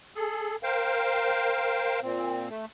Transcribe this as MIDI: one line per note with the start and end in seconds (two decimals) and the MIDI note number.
0.15 0.56 68
0.15 0.56 69
0.63 2.00 70
0.63 2.00 72
0.63 2.00 77
0.63 2.00 79
2.03 2.48 46
2.03 2.48 60
2.49 2.65 57